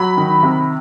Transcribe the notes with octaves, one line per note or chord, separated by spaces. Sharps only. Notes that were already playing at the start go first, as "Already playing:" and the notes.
Already playing: F#3 B5
D#3
C3